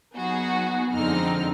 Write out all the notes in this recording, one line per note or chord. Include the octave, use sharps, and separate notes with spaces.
F#3 B3 D#4 F#4 G#4
F2 D3 G#3 C4 D#4 F6